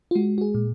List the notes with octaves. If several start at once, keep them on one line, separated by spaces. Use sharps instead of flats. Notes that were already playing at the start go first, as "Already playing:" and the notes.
F4
G#3 F#4
F#4
G#4
A#2